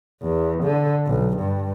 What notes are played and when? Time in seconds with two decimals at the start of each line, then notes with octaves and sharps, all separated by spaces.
0.23 E2
0.64 D3
1.07 B1
1.37 G2